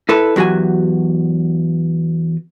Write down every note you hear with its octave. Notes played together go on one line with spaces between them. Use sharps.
E4 A4 B4
E2 F#3 F#4 G4 G#5